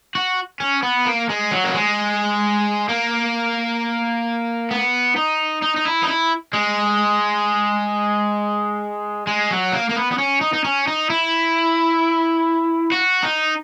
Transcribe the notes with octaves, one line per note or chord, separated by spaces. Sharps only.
F#4
C#4
B3
A#3
G#3
F#3
A#3
G#3
A#3
B3
D#4
D#4
D#4
E4
D#4
E4
G#3
G#3
F#3
A#3
A#3
B3
B3
C#4
D#4
D#4
C#4
D#4
E4
F#4
D#4